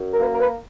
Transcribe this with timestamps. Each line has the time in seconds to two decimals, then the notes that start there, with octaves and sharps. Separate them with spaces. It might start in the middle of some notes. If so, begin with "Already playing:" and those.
Already playing: F#2
0.13 A#4
0.19 A#3 B4
0.34 A#4
0.39 B4